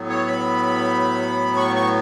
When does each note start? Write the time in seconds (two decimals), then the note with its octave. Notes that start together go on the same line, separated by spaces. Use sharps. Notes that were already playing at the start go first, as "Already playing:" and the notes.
Already playing: A2 F#3 B3
0.09 C#5
0.27 B5
1.57 C#6
1.76 C#6